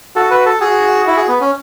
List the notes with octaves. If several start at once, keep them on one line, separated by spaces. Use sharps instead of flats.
F#4 A4
B4
A4
F#4 G#4
E4
G#4
B3
C#4